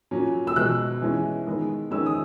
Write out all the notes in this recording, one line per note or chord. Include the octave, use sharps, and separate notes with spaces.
A#2 F#3 C#4
E6
B2 G#3 B3 F#6
E3 G#3 C#4
D#3 G#3 B3
D#3 G#3 C#4 E6
D#6